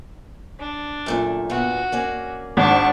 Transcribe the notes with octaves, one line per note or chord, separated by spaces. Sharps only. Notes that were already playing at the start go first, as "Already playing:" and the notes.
D4
F#2 A#2 A3
A#2 B3 F#4
A#3 C#4 D5
G#1 D4 C#6